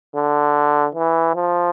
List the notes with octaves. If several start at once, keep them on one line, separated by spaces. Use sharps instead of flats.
D3
E3
F3